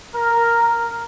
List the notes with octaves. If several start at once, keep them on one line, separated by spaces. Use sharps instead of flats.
A#4